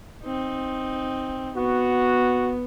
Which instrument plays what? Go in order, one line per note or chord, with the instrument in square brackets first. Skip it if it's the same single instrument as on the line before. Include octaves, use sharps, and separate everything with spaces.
[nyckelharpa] C4 D#4
[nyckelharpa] B3 [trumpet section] F#4